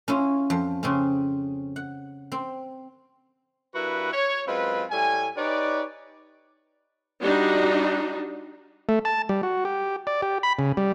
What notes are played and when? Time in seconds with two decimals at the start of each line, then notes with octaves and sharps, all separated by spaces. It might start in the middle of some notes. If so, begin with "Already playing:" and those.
0.08 C#4 E4 F4
0.50 F2
0.83 C#3 C4 C#4
1.76 F#5
2.32 C4
3.75 G2 E4 F#4 A#4 B4
4.12 C#5
4.47 F#2 G#3 C4 F4 B4
4.91 A2 G3 A3 G#5
5.37 D#4 G4 B4 C#5 D5
7.21 G3 D4 D#4 F#4
8.89 A3
9.05 A5
9.29 G3
9.43 F#4
9.65 G4
10.07 D5
10.22 G4
10.43 B5
10.59 C#3
10.77 G3